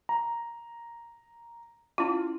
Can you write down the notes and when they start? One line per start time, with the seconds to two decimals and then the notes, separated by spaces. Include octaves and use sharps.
0.09 A#5
1.98 C#4 E4 F4